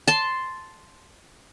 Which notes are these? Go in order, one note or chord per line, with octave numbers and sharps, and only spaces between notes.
A5 C6